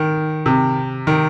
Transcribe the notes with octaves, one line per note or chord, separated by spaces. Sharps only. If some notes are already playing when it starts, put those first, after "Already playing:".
Already playing: D#3
C3
D#3